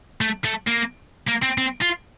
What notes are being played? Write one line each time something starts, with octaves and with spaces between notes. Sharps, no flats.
A3
A3
A#3
A#3
C4
C4
F4